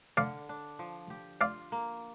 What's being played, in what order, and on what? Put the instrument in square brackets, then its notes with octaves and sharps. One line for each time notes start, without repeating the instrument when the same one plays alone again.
[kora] D3 [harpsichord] D5 F5
[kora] D4
F3
G4
[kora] F4 [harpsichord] D5 F5
[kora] A#3